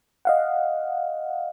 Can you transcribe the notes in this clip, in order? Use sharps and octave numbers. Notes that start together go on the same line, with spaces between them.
D#5 F5 F#5